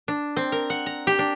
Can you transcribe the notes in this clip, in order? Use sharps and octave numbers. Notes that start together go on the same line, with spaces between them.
D4
C4
A#4
F#5
A#5
G4
D4